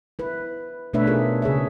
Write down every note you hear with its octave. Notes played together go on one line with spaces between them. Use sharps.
E4 B4
B2 A3 D4 B4 C#5 E5
D#4 F4 G#4 A#4
C#3 G#4 C#5 E5